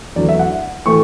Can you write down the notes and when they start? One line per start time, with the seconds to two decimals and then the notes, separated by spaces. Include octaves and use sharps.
0.16 E2 D3 F#3 A3 D5
0.29 E5
0.39 F#5
0.86 A2 E3 A3 C#6